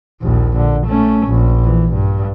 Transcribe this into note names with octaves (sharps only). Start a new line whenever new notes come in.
A#1 D#2
D3
A3 C#4
A#1
E3
G2